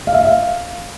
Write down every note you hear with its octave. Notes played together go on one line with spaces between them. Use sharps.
F5
E5
F5